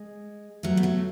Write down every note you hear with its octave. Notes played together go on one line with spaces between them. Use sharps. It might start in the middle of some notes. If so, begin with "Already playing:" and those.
Already playing: G#3
F#3 A3
B3
F#3 A3